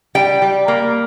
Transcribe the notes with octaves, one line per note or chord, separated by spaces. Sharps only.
G3 G5
G3
A#3